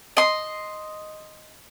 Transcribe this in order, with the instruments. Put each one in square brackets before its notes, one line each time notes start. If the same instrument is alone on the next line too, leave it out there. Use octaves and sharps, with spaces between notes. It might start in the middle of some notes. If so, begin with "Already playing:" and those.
[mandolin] D#5 C6